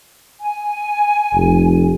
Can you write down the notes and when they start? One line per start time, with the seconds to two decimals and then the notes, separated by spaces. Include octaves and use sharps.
0.40 G#5
1.33 F1